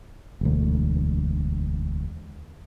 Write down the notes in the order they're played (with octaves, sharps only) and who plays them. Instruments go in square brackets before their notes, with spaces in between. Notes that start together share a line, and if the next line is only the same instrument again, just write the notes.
[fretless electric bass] E1 D2